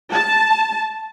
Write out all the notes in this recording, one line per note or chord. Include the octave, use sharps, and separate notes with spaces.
A5